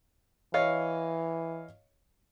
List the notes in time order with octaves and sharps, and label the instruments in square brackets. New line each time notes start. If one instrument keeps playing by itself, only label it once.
[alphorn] E3 [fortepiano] C#5 D#5 F5